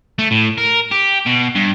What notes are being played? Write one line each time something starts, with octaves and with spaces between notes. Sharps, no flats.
A3
A2
A#4
G4
B2
G2